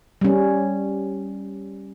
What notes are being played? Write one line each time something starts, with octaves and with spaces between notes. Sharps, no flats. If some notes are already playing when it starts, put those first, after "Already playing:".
G3 C#4